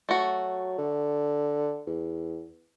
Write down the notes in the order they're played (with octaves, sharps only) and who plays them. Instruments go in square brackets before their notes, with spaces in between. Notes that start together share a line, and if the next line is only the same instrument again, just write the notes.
[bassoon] F#3 [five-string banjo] A3 F#4
[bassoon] D3
E2